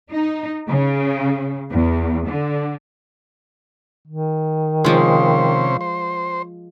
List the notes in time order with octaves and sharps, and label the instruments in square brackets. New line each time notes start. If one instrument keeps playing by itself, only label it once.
[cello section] D#4
C#3
E2
D3
[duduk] D#3
[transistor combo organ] C3 C#4 C5 [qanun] F3 G#3
[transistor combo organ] C5